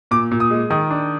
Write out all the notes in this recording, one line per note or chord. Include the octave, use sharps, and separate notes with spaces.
A#2 D6
A#2
D#6
G#3
D#3 D#6
D4